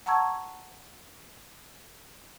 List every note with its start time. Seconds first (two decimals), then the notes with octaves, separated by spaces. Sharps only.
0.06 F#5 A5 A#5 C#6 E6 G#6